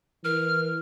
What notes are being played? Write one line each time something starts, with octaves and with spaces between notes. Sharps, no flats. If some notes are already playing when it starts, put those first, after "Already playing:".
E3 A#4 F6